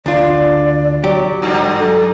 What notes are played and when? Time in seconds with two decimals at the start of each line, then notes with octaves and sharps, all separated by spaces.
0.06 D2 D4 F4 D5
1.04 F#3 G4
1.42 G2 D3 G3
1.79 A4